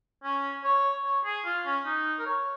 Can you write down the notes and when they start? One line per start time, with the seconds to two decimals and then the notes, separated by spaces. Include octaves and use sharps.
0.23 C#4
0.64 C#5
1.04 C#5
1.25 G#4
1.45 F4
1.65 C#4
1.86 D#4
2.19 A#4
2.26 C#5